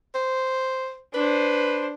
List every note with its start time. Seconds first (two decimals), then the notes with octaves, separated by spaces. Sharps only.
0.15 C5
1.14 D4 B4 C5